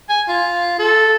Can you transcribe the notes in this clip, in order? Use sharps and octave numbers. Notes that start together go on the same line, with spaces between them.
G#5
F4
A4